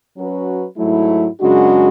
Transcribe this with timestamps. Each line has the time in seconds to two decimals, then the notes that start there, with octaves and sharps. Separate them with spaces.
0.15 F#3 C#4 F#4 B4
0.77 G#2 F#3 A3 E4
1.40 F#2 C#3 G#3 D4 F#4